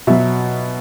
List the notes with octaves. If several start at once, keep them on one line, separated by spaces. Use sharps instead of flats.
B2 F#3 E5